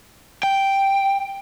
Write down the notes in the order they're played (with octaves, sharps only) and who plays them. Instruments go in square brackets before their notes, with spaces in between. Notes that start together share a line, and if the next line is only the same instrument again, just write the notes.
[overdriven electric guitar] G5